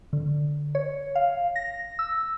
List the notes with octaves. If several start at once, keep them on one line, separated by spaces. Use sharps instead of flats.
D3
C#5
F5
A#6
E6